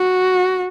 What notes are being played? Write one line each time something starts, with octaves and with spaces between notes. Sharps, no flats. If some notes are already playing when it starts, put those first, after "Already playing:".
Already playing: F#4